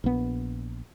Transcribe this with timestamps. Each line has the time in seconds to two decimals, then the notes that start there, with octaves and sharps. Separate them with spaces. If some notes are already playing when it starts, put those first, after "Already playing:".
0.04 A#1 B3